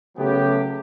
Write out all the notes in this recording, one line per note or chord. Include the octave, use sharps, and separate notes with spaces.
C#3 F#3 A3 B3 G4